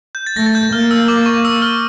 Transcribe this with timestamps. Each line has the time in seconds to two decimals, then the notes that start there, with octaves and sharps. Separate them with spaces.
0.15 G6
0.27 A6
0.36 A3 A#6
0.46 A6
0.55 G6
0.73 A#3 F6
0.91 E6
1.08 D6
1.26 C#6
1.45 E6
1.62 F6